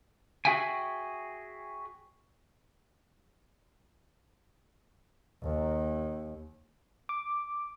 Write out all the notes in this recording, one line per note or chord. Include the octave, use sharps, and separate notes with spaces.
F#4 G#4 E5 G5 G#5
D#2
D6